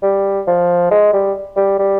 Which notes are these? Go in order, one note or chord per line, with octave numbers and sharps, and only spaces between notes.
G3
F3
G#3
G3
G3
G3